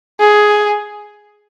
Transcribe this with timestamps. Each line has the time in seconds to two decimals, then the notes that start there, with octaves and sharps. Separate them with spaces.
0.20 G#4